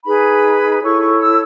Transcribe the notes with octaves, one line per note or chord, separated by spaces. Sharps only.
D#4 G#4 B4 B5
E4 A4 C#5 C#6
C#6
E6